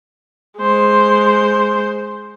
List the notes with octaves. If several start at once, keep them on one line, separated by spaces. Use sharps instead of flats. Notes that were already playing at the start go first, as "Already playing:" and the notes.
G#3 C5